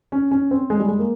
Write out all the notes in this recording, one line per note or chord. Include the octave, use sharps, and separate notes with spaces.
C#4
C#4
C4
G#3
G3
G#3
A#3